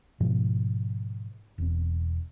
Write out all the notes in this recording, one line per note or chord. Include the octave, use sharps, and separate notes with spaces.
G#2 B2 F3
E1 C4